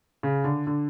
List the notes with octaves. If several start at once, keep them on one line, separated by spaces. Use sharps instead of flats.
C#3
D3
D3